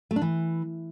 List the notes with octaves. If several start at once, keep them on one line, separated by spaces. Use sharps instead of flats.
A3
D4
E3